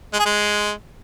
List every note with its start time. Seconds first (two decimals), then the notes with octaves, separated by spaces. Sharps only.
0.13 G#3
0.19 G#4
0.26 G#3